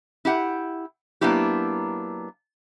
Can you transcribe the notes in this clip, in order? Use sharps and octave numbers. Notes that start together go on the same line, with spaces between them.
E4 G4 F#5
F#3 A#3 B3 D4 E4 G4